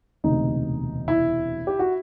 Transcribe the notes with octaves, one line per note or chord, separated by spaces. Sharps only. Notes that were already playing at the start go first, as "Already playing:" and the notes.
E1 D2 C3 D#4
E4
G4
F#4